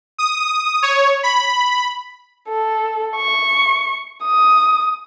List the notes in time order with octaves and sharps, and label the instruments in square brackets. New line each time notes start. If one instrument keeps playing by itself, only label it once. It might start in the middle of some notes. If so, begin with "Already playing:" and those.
[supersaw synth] D#6
C#5
B5
[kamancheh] A4
C#6
D#6